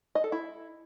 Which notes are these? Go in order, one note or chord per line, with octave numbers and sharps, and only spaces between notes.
D#5
A4
E4